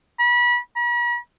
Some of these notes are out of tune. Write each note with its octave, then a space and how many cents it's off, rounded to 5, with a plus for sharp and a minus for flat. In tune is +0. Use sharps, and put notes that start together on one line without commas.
B5 -30
B5 -45